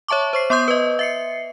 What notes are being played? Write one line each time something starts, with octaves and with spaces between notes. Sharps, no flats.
C#5 E5 A5 C#6 D6
C5 C#6 C7
B3 C6 D#6 G6
B4 D#5
E5 C7 C#7